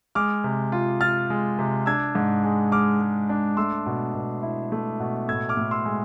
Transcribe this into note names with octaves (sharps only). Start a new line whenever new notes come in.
G#3 D6 F6
C3
F4
F4 F6 A6
G#3
C3
D4 E6 G#6
G#2
G#3
G#3 D6 F6
G#3
D4
A3 C6 E6
B2
B2
E4
A3
B2
A2 E6 G#6
D6 F6
A2
C6 E6
G#3